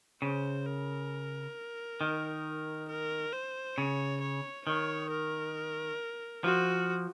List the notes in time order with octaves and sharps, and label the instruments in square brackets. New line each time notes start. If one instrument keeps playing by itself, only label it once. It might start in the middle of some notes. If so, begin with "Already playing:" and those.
[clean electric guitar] C#3 [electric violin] C5
[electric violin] A#4
[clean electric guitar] D#3
[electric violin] A#4
C5
[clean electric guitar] C#3 [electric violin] C#5
[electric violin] C#5
[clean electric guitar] D#3 [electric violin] C#5
[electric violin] A#4
[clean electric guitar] F3 [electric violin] F#4